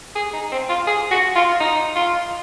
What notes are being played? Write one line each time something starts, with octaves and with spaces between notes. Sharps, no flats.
G#4
D#4
C4
F4
G#4
F#4
F4
D#4
F4